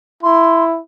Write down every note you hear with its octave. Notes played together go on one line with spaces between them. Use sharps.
E4 C6